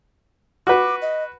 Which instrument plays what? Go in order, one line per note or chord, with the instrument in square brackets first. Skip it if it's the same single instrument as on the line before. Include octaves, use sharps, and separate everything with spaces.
[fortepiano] F#4 B4 [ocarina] D6
[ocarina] D#5